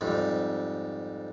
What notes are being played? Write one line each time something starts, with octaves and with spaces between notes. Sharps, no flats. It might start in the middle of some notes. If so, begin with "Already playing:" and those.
F2 G#2 G3